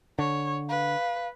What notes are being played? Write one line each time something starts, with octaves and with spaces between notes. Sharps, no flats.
D3 C#5
B4 F5